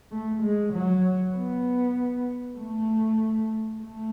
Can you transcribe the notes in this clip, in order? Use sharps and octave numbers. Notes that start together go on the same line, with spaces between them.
A3
G#3
F#3
B3
A3
A3